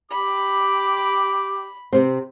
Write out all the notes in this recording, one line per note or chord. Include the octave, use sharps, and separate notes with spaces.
G4 B5 D6
C3 C4